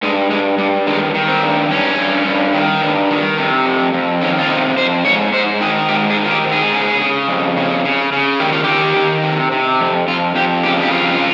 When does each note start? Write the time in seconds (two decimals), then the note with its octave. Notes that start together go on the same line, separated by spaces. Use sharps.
0.03 G2 G#3
0.30 G2 G#3
0.58 G2 G3
0.87 D#3 G#3
1.14 D#3
1.28 C4
1.43 G2
1.70 G2 C#4
1.98 G2
2.26 G2
2.53 D#3
2.82 G2
3.10 D#3
3.38 C3
3.66 F2
3.94 F2
4.22 D#3 C#4
4.39 F4
4.49 C3 D#4
4.77 F2 C5
5.05 G#2 C#5
5.33 G#2 C5
5.61 D#3 G#4
5.89 G#2 G4
6.10 G#4
6.17 D#3
6.24 F4
6.31 G4
6.45 G#2
6.52 G#4
6.72 C#3
7.01 C#3
7.28 F2
7.57 C#3
7.85 C#3
8.12 C#3
8.40 D#3 G4
8.53 F4
8.64 D#3 G4
8.96 D#3
9.23 C3
9.51 C3
9.80 F2
10.08 F2 F4
10.35 F2 G4
10.63 C#3 G4
10.82 G4
10.92 F2 F4